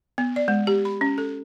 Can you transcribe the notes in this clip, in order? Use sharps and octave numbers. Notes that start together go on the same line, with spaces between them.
B3
D5
G#3
G4
B5
C#4
A4